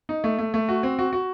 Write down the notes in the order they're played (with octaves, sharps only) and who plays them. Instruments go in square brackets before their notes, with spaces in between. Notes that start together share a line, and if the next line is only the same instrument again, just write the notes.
[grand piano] D#4
A3
A3
A3
F#4
C4
F#4
F#4